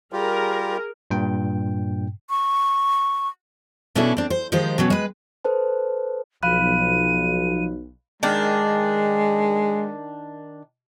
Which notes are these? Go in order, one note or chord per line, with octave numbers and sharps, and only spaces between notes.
G3 F4 G4 G#4 A#4
G2 A#2 G5
C#6
B2 C#4 D4 E4 A4
C4 D4
C5
D#3 F3 G#3 G4 C5
B2 F#3 C#4
G#3 B4
A4 B4 C5 A5
B1 F3 F5 B5 F#6 D#7
D#3 G#3 D4